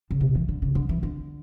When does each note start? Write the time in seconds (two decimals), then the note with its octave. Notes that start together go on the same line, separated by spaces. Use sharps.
0.11 C#3
0.20 B2
0.35 E3
0.49 D3
0.62 C#3
0.75 D3
0.89 E3
1.03 D3